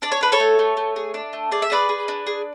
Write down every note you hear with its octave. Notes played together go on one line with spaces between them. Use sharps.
D4 D5
C#5
D4 B4
A4 C#5
A3
A3
A3
G#4
D4
A3
G#4 D5
E5
G#4 B4 D5
G#4
D4
G#4